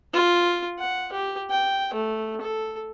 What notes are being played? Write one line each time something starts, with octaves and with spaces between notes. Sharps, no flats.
F4
F#5
G4
G5
A3
A4